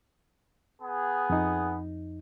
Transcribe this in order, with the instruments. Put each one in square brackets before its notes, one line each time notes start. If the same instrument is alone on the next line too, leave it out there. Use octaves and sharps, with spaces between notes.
[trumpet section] B3 G#4 F#5
[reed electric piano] F2 D#4